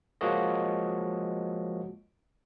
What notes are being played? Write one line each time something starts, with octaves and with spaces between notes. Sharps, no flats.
F3 G#3 A#3 F#4 C#5 D#5